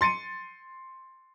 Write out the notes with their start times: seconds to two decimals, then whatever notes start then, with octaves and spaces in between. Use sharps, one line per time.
0.01 C6 A6 C#7 D#7